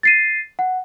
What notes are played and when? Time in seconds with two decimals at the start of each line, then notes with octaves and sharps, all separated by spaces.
0.03 A6 C7 D#7
0.59 F#5